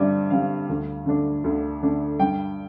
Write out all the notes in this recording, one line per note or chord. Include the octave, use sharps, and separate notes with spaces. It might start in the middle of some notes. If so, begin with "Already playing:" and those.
Already playing: G2 D3 G3 C4 D5 E5
D3 G3 C4 F5
D2
D3 A3 D4
D2
D3 A3 D4
G2 G5